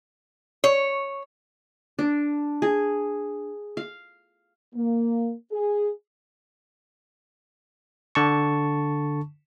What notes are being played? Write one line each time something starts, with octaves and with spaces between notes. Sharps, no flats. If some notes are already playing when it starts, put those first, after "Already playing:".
C#5
D4
G#4
F5
A#3
G#4
D3 A5 C#6